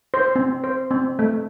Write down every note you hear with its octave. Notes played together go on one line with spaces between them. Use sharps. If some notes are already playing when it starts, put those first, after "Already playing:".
C5
C4
C5
C4
A3